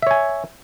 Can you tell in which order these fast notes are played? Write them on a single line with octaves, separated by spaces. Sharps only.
E5 C#5 G#5